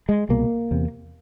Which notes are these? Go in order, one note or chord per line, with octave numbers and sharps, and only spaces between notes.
G#3
C2 B2 A#3
E2 C3